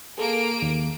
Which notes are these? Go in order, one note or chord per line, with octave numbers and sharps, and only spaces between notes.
A#3 G#4 A4 D7
D#2